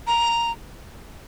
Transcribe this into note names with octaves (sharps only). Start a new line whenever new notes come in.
A#5